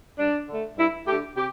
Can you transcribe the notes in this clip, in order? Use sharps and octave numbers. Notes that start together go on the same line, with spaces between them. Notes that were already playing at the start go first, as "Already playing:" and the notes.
G2 D4
D3 A3
G2 E4
D3 A3 G4
C3 G4